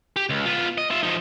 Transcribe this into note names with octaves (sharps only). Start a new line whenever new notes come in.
G4
C#2
B3 F4
D#5
F4 E5
F3 D#4